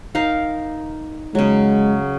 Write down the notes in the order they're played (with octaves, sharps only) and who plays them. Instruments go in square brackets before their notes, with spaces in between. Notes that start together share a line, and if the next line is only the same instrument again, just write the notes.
[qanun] D#4 A#4 F5
[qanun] C#3 F#3 [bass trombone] G#3